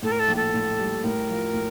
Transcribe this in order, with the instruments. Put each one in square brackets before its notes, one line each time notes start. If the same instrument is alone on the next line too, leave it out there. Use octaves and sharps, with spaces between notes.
[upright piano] A2 [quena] A4
[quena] A#4
A4
[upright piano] A#1
[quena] A4
[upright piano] A2
G3
[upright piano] A2 [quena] A#4
[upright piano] F3
A2